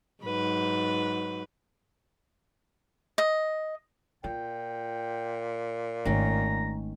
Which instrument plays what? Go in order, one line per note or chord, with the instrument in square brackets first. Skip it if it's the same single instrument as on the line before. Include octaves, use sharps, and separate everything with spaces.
[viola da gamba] G#2 F#3 B4
[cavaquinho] D#5
[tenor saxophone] A#2 [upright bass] F4 [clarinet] G5
[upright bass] G#1 A3 [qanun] D#3 C#4 [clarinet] A#5